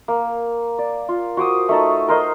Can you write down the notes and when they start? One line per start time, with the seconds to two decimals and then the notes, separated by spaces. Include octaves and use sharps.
0.08 A#3
0.79 D5
1.09 F4
1.37 F#4 C5 D6 D#6
1.69 A3 D#4 A5
2.08 A#4 C5 D#5